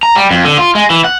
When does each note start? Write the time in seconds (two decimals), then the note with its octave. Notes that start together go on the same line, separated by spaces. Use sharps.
0.03 A#5
0.15 G3
0.31 F2
0.45 D3
0.58 F4
0.75 G#3
0.90 E3
1.04 F#5